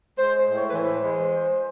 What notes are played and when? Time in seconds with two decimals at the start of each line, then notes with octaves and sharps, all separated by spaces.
0.18 G#3 C5
0.37 C5
0.46 A2
0.55 C#5
0.68 B4
0.74 E3 C5
1.01 G#3